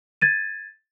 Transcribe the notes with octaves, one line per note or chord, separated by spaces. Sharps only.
G#6 A6 D#7